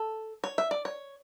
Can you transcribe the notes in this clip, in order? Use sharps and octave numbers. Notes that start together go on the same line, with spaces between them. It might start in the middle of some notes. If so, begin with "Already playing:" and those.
Already playing: A4
C#5
E5
D5
C#5